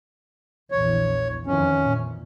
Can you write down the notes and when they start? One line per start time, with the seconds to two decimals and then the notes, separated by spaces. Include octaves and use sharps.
0.72 A#1 E2 C#5
1.47 F2 D#3 E3 C#4
1.81 A#2